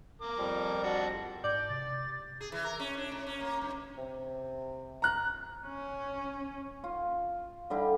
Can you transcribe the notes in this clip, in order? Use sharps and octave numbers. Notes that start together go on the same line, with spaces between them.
A#4 D6
F2 F3 G3
D4 F#4
G#2 D5 G6
C3 A6
G#4
E3
A#4
C#4
D4
A2
C#4
A#3
G2
C3
A#5 F#6
C#4
F4
D3 G3 E4